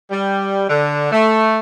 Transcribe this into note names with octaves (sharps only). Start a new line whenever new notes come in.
G3
D3
A3